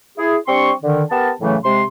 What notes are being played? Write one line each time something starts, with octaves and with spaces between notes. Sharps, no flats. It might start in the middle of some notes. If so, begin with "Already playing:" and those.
E4 G#4
G3 C4 D4 C6 C#6
D3 D#3
B3 G4 A#4 A5
A2 C#3 E3 F#3 A3
C3 G#3 C6